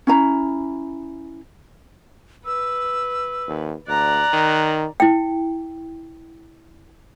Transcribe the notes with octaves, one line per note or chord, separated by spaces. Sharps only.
C#4 E4 A#5
B4 E6
D#2
D2 D5 A#5 F#6
D#3
E4 G5